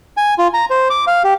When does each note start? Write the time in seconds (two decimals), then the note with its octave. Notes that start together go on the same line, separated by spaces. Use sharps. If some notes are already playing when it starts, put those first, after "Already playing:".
0.17 G#5
0.38 F4
0.54 A#5
0.70 C5
0.90 D6
1.07 F5
1.24 G4